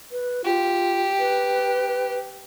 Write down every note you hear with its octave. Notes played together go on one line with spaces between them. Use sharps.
B4
F4 G4
B4